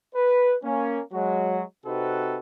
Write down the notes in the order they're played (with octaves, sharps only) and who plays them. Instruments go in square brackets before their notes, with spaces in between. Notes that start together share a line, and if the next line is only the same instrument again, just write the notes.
[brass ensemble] B4
A#3 C#4
F#3 G#3 F#4
C3 C4 D#4 F#4 A4 B4